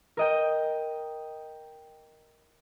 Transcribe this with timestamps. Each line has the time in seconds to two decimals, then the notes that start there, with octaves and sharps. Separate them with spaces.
0.17 A#4 D#5 G5